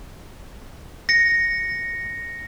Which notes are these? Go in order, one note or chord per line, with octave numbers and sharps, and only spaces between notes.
A#6 C#7